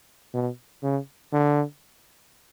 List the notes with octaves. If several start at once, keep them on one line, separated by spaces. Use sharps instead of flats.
B2
C#3
D3